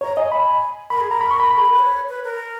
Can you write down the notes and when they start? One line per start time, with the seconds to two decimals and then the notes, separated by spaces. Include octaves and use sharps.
0.01 C#5 A#5
0.16 D#5 G#5
0.32 B5
0.90 A#4 B5
1.01 G#4
1.11 A#4 A#5
1.21 B5
1.31 C#6
1.40 B5
1.51 B5
1.57 G#4
1.65 A#4
1.73 B4
1.79 C#5
2.09 B4
2.24 A#4